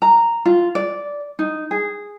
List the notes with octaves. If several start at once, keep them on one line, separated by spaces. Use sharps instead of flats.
A#5
F4
D5
D#4
G#4